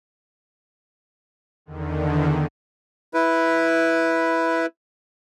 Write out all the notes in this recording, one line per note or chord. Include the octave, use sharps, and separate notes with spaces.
E2 D3 D#3
E4 B4